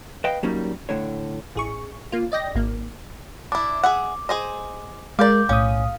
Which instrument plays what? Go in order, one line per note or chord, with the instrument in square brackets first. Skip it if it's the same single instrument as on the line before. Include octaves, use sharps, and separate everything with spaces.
[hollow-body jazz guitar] B4 D#5 F5 G5
F#3 G3 A#3 C#4 D#4
A2 D3 C#5
[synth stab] A1 G#4 C#6
A#3 F4
D5 D#5 G5 A#6
G#1 A#3
[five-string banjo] D4 E4 [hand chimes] D6
[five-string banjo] G#4 E5 F#5
G#4 C5 D#5
[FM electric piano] G#3 A#4 [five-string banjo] D5 F5 [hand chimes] D6 G6
[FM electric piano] B1 A2 D#6 [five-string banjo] C#4 [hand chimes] F5